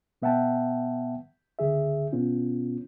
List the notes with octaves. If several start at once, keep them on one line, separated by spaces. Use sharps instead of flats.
B2 B3 E5 F#5 G5 A5
C#2 D3 G#4 E5
B2 B3 C#4 F4